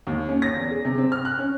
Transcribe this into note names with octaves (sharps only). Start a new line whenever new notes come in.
D#2
C#4
A#6
E2
G#4
C3
C4
F6
F#6
C#4